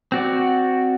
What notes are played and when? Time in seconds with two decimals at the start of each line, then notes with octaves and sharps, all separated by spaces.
0.12 C4 F#4 D5